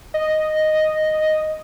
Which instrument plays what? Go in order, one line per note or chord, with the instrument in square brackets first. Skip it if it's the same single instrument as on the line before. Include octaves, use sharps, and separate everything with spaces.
[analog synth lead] D#5